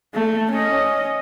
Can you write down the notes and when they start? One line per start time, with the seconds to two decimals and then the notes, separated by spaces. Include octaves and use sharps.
0.14 A3
0.51 C#4 D#5